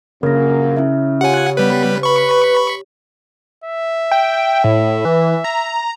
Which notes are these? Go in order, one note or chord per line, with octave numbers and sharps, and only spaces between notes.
A#1 F#2 C#3 A#3 A#4 A#6
C#4 E4 E5
F4 G4 C#5 F#5 G#5
G3 B3 B4
B4 B5 C#6
E5
G5
A2
E3
A#5